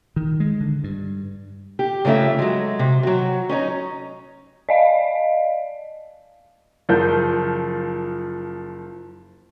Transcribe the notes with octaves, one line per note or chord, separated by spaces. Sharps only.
D#3
G#3
D3
G2
G4
C#3 F3 A3 A#3 E5
F#3 G#3
C3
F#3 F#4
C#4 D#4 C#5 A#5
D5 D#5 F5
F#1 F3 A#4 G6